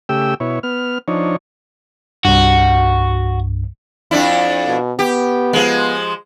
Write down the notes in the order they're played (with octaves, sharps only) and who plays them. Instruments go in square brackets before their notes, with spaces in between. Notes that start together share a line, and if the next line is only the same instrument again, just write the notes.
[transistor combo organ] C#3 A3 G4 G5 E6
B2 E4 C#5
B3 F6
F3 D4 D#4 C#5
[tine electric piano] C2 G2 [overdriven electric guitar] F#4
[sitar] F2 D4 E4
[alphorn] B2
[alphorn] B3 [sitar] G4
[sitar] F3 G#3